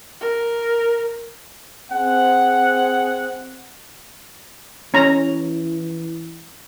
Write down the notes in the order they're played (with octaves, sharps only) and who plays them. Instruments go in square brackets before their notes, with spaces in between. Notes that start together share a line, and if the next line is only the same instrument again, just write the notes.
[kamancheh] A#4
[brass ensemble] C4 G#4 F#5
[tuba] E3 [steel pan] C#4 A#5